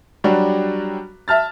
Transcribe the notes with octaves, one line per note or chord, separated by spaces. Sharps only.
F#3 G3 D4 F#4
E5 A5 F6 A6